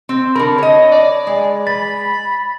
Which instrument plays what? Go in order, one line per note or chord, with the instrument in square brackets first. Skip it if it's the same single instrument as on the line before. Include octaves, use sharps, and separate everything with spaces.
[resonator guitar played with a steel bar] C4
[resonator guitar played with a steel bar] D3 A#4 [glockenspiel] B5
[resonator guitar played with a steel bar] C#5 D#5
[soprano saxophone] D5
[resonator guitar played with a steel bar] G#3
[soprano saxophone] B5 [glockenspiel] A6